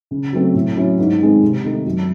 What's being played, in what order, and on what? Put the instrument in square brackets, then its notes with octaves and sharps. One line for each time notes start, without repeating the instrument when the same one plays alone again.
[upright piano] C#3
F#3 A3 C4
A2
F#3 C#4 E4
G#2
D#3 G#3 C4
C3
D#3 A3 D#4
F#2